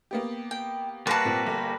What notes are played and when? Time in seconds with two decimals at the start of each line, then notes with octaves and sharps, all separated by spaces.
0.11 A#3 B3 G4
0.51 G5
1.07 G3 A#3 F#4 B4 A5 C6 A#6
1.25 A#2 C4
1.46 G1